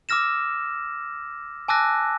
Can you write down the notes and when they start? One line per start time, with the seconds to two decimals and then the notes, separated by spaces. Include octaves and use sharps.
0.09 D6 E6 F6 A#6 E7
1.68 G#5 A5 D6 E6 F#6 A#6